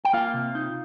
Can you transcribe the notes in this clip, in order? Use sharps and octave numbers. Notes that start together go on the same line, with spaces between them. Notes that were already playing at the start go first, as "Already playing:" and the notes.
G5
A#3 F4 F5
C3
D#4